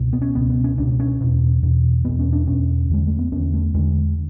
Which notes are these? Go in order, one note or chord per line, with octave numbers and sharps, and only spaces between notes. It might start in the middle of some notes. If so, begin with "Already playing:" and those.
Already playing: C#2 B2
B3
C#4
C#2 B2 B3
B3
C#4
C#2 B2 D4
C#4
E2 B2
E2 B2
E2 B2 B3
C#4
D4
E2 B2 C#4
E2 D3 G#3
A3
B3
E2 D3 C#4
A3
E2 D3 G#3